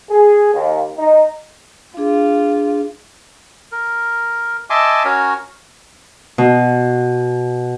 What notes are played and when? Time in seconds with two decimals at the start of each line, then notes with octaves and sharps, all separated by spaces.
0.10 G#4
0.54 D#2
0.98 D#4
1.97 D4 F4 G#4
3.72 A#4
4.70 D#5 E5 G#5 A5 C6 D6
5.05 C#4 F#4 A#4 C#5
6.38 B2